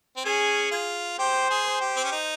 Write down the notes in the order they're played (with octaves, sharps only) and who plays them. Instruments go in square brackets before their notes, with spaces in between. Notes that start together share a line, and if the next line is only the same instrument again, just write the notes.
[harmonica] C4
[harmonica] C#4 [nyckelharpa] G#4
[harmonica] F4
[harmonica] G4 [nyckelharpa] C5
[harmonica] G#4
[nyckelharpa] C5
[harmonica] G4
C4
C#4
D#4